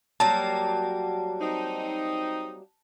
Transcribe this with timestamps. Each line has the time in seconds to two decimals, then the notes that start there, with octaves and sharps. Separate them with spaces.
0.20 F#3 G3 A#3 A5
1.41 C4 D#4